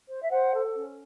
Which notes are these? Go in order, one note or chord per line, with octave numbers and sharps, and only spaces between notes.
C5
E5
C5 F#5
A4
C#4